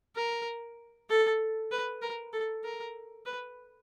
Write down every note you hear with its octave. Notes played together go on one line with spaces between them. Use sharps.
A#4
A4
B4
A#4
A4
A#4
B4